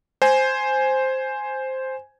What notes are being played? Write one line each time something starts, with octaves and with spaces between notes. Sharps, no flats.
C5 G#5